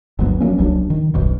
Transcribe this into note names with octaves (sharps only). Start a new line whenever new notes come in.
G1 D2 F#3 B3
F#3 G#3 A#3 C#4
D#1 C2 F#3 D4
D#3
D#1 B1 F#2